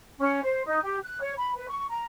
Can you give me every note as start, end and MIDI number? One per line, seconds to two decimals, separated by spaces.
0.18 0.40 61
0.43 0.62 72
0.65 0.79 63
0.83 0.97 67
1.03 1.19 90
1.20 1.32 73
1.36 1.52 83
1.56 1.67 71
1.68 1.84 85
1.89 2.04 82